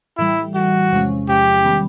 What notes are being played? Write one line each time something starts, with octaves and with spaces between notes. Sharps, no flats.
A2 E3 G3 E4
A2 E3 G3 F#4
E2 C3 F3 G#3 C#4
E2 C3 F3 G#3 C#4 G4
D#3 G3 B3